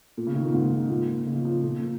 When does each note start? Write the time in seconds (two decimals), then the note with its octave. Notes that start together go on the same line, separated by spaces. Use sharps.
0.17 A#2
0.27 C#3
0.35 D#3
0.45 A#2
0.54 G#2
0.90 A#2
1.27 C#3
1.35 F3
1.45 F3
1.64 A#2